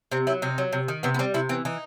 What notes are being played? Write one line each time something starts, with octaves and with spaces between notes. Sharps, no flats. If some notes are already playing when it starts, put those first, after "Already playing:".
C3 C4
F#3 E4
C3 D#4
F#3
C3
D#3
C3 B3
B3
G3 C4
C3 E4
E3 C4
E3 D#4